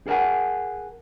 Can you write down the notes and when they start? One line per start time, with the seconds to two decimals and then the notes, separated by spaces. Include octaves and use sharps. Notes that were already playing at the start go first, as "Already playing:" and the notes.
0.07 G#4 A#4 D5 F#5 G#5